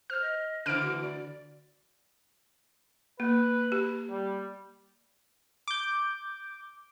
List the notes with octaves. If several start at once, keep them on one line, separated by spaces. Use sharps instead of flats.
C5 F6
D#5
D3 E3 C5 F6 D7
D2 F#4
D5
A#3 B4
G4
G3
D6 G6